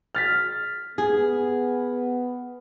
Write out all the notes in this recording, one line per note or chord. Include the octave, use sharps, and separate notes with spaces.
F6 A6 B6
B3 G#4